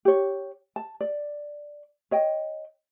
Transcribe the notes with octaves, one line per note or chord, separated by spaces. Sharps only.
G4 C#5
A5
D5
C#5 D#5 G5